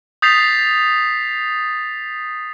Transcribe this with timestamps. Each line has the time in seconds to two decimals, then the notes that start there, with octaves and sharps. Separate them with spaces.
0.22 D#6 G6 A6 B6 C7 F7